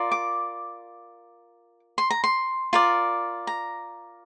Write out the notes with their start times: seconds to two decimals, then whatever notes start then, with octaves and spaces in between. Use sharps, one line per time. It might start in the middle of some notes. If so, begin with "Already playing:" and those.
Already playing: F4 A#4 D5
0.12 D6
1.98 C6
2.10 A#5
2.24 C6
2.73 F4 A#4 D5
3.47 A#5